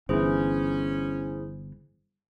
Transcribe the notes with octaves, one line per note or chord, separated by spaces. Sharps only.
G1 E3 C#4 E4 G#4 C5